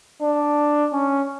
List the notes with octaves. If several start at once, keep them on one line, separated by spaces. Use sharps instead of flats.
D4
C#4